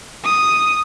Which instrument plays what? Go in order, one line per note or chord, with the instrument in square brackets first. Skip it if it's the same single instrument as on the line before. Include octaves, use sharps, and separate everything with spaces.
[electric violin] D#6